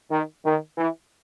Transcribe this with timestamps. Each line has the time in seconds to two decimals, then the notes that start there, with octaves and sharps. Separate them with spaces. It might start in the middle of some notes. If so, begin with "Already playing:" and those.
0.10 D#3
0.44 D#3
0.77 E3